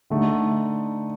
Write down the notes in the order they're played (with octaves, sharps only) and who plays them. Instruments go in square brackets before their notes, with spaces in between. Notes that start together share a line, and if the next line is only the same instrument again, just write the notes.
[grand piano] D3 A3 D#4